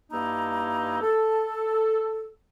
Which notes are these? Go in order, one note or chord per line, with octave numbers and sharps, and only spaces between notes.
G2 A#3 D#4 E4 A#5
A4